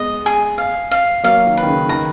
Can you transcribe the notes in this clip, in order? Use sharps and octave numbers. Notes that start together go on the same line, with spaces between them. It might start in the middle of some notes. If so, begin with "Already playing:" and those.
Already playing: G#3 B3 D#5
G#4
F5
F5
F#3 A#3 F5
D#3
D#3 B4
C#3
D#3 A#5